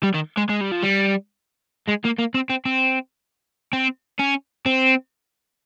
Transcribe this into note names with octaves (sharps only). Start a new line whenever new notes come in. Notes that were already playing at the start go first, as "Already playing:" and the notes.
G3
D#3
G#3
G#3
G3
F3
G3
G#3
A#3
A#3
C4
C4
C4
C4
C#4
C4